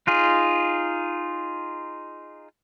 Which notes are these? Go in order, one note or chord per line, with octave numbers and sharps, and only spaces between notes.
D#4 F4 G#4